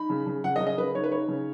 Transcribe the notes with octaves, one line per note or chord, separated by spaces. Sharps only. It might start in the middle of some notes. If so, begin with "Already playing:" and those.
Already playing: D#4 B5
C#3
C#3
C#3 F#5
D#5
C#3
D#5
C#3 B4
D#4 C#5
B4
D#4 C#5
C#3